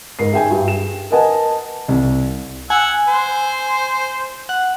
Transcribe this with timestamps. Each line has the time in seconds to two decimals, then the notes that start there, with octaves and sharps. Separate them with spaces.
0.19 G#2 A#4 C7
0.32 G#4 E5 G5 G#5
0.50 G2
0.68 E7
1.11 A#4 B4 D#5 F#5 G#5 A5
1.88 C2
2.70 F#5 G#5 E6
3.08 C5
4.49 F#5